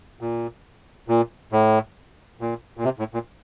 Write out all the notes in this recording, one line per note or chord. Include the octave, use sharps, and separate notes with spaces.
A#2
A#2
A2
A#2
A#2
C3
A2
A#2